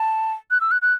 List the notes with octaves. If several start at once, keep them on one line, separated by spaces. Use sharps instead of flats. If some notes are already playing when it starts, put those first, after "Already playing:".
Already playing: A5
F#6
E6
F#6
F#6